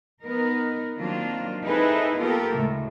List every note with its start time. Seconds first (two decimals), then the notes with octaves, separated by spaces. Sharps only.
0.23 B3 D#4 A#4
0.97 D#3 F#3 A#3 C4 D4 F4
1.65 C4 D#4 E4 G#4 A4 B4
2.19 A#3 B3 F4 G4 A4 A#4
2.55 D2 A2 C#3 G#3